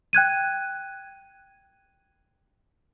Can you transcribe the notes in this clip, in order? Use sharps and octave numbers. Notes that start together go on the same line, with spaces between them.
G5 F#6 G#6 D#7